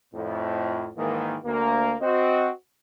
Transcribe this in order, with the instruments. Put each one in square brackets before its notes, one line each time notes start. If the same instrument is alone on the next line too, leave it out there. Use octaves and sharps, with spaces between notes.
[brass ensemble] F2 A2
G#2 D#3 E3 A#3
D2 A#3
C4 F#4 D#5